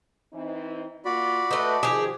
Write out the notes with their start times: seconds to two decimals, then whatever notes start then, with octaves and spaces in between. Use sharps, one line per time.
0.33 E3 C4 D#4
1.05 A#3 F4 F#4 D5 B5
1.51 A3 D#4 B4
1.83 D#3 F3 G4 G#4 C5